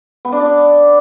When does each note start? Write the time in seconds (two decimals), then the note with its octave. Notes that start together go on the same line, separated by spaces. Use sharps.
0.25 B3
0.32 D4
0.40 D5